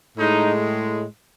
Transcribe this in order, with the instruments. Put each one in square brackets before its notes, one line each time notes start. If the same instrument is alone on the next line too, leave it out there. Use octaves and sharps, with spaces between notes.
[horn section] A2 G#3 D#4